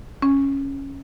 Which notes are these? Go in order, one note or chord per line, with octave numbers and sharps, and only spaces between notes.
C#4